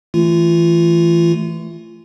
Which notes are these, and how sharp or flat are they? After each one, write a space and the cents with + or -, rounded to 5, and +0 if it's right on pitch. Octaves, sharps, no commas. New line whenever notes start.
E3 +0 A3 +0 F4 -30